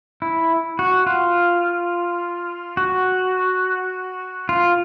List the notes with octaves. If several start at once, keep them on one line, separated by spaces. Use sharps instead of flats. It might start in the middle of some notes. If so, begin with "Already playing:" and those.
E4
F#4
F4
F#4
F4